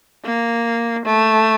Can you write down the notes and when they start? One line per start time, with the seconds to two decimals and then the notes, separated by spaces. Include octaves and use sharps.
0.25 A#3
1.05 A3